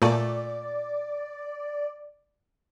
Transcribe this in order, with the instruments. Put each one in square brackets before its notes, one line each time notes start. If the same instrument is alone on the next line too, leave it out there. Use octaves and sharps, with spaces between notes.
[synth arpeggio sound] A#2 A3 [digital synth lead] D5